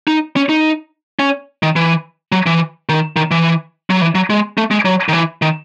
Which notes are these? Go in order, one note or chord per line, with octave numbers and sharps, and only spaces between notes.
D#4
C#4
D#4
C#4
D#3
E3
F#3
E3
D#3
D#3
E3
F#3
E3
F#3
G#3
A3
G#3
F#3
D#3
E3
D#3